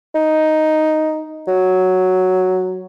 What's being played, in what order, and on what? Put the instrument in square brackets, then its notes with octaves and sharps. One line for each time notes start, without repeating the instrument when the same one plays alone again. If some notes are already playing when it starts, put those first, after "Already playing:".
[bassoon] D#4
F#3